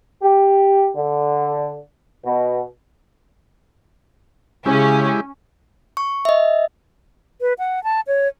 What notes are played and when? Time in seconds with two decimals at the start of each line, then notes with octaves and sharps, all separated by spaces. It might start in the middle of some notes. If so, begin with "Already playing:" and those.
0.23 G4
0.96 D3
2.24 B2
4.66 C#3 G#3 C#4 E4 G4
5.97 C#6
6.25 D#5 E5
7.41 B4
7.59 F#5
7.84 A5
8.07 C#5